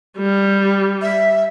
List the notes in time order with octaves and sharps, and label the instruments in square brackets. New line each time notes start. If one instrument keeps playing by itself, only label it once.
[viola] G3
[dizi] E5